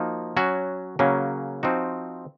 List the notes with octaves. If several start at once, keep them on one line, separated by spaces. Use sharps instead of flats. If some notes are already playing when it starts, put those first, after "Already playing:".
Already playing: F3 A#3 D#4 F#4
F#3 C#4 F#4
C#3 F#3 A#3 C#4
F3 C4 D#4 F#4